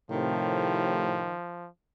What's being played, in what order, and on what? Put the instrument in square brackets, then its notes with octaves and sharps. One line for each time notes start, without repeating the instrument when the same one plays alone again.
[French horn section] A2 C3 [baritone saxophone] D#3 [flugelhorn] F3